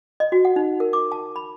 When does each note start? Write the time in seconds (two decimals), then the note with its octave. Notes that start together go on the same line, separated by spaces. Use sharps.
0.20 D#5
0.32 F#4
0.45 F#5
0.56 D#4
0.80 A#4
0.93 D6
1.12 A5
1.36 B5